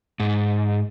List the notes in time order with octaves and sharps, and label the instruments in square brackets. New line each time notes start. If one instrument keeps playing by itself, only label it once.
[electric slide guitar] G#2